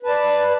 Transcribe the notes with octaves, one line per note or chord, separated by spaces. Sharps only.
B4 D5 A5